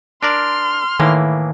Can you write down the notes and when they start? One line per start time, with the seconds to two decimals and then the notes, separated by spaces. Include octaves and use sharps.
0.23 D4 A#4 D5 C6 F6
1.00 A2 D#3 E3 A#3